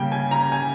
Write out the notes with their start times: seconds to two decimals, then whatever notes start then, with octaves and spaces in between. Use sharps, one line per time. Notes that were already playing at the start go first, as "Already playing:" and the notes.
Already playing: C#3 G3 A#3 G5
0.12 G#5
0.31 A#5
0.52 G#5